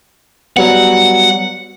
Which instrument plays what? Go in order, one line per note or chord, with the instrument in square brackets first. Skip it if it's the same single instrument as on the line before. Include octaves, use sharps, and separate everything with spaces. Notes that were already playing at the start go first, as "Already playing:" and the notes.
[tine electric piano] F#3 G3 B3 [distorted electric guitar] F#5